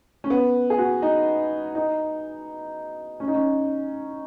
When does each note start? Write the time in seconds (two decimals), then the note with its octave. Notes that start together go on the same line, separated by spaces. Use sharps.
0.24 C#4
0.30 B3
0.70 G#4
0.78 F#4
1.02 D#4
1.75 D#4
3.20 C#4
3.28 D#4
3.35 C#4